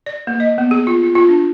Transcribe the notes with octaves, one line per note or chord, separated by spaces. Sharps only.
D5
A#3
D#5
B3
G#4
F4
F4
F4
D4